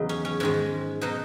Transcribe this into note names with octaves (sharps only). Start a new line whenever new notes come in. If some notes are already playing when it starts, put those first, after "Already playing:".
Already playing: E2 C#3 F#3 D#4
C#4
C#4
G#2 D#3 G#3 C#4
B2 F#3 D#4